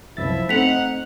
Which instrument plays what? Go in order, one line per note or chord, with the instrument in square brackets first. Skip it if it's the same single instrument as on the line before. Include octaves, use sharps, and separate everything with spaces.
[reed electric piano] C2 F#2 A6 [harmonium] F3 E4 [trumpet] E5
[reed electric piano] A3 C4 [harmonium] D#4 [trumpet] F#5 [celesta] B6 F7